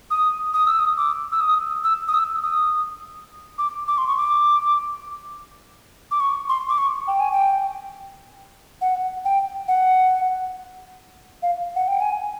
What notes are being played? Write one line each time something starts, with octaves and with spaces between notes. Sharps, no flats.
D#6
D#6
E6
D#6
D6
E6
D#6
E6
D#6
E6
D#6
D6
D6
C6
C#6
D6
D6
C#6
C6
D6
C#6
G5
G#5
G5
F#5
G5
F#5
F5
F#5
G5
G#5